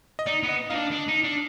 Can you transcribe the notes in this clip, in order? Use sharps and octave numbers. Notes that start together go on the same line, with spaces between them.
D#5
D#4 D5
B3
D#5
D#4 F5
D4
D4
D#4
D4